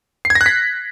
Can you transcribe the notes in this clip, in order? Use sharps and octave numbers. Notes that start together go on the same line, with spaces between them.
C7
G#6
A#6
F#6
B6